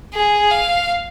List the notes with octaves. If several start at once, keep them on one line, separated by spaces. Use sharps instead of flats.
G#4
F5